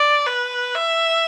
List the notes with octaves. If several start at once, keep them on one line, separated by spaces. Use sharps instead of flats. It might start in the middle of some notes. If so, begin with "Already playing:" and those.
Already playing: D5
B4
E5